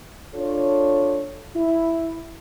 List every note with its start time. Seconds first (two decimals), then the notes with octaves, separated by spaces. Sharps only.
0.34 D4 F4 A4 C#5
1.55 E4